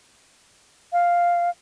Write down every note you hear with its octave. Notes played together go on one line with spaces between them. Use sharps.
F5